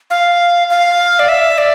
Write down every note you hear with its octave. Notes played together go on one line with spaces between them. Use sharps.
F5
F5
D5
E5
D5